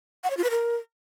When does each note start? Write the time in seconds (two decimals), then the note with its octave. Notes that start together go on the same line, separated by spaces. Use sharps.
0.24 F#5
0.30 C#5
0.37 F4
0.44 B4
0.50 A#4